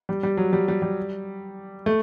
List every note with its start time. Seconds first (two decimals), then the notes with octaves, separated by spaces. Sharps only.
0.09 G3
0.23 G3
0.37 F#3
0.53 G3
0.68 G3
0.82 G3
1.86 A3